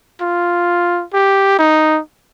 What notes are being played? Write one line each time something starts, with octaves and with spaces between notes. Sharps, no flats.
F4
G4
D#4